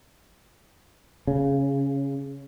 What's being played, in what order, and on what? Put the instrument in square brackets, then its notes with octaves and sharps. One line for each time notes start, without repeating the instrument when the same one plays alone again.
[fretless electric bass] C#3